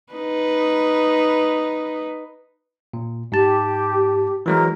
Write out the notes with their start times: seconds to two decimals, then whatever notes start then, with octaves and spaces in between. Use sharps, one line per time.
0.13 D#4 B4
2.93 A#2
3.32 G#2 G4 A5
4.46 E3 F#3 G#3 A#4